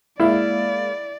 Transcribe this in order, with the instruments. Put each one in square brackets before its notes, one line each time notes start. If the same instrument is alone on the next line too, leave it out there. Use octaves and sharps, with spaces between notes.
[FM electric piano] G#3 A#3 F5 [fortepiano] E4 [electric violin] D5